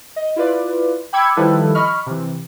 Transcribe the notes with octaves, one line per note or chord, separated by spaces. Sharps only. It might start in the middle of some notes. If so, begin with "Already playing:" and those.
D#5
E4 F4 B4 D5
G5 B5 D6 E6 G#6 C#7
D#3 F3 G3 E4 A4 B4
D#5 B5 C#6 F6
C3 E3